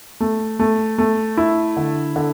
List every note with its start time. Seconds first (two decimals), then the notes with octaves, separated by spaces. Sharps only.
0.20 A3
0.59 A3
0.98 A3
1.38 E4
1.77 D3
2.16 D3